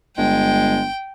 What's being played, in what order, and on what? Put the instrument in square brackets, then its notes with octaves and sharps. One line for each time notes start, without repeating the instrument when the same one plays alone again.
[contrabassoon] G1 [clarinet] G#3 [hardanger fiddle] G5